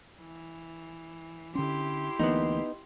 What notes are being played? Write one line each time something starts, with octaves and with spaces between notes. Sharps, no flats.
E3
D3 C#4 E4 G4 C6
D2 E3 A#3 B3 D#4